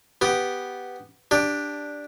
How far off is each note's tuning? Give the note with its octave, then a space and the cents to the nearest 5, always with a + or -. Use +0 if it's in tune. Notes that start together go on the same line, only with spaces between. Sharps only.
B3 +0 G4 +0
D4 +0 G4 +15